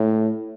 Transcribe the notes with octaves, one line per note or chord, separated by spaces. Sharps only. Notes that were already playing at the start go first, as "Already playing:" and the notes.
Already playing: A2